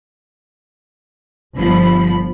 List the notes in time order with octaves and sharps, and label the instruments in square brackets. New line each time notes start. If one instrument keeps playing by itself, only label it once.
[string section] G1 F3 B5